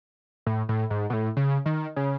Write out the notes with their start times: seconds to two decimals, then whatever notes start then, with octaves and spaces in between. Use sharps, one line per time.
0.46 A2
0.69 A2
0.90 G#2
1.10 B2
1.13 A2
1.37 C#3
1.66 D#3
1.96 C#3